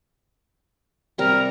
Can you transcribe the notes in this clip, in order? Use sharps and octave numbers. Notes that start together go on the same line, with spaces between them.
C3 G3 A#4